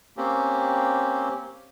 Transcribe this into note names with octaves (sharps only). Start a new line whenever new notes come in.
A#3 C4 C#4 G4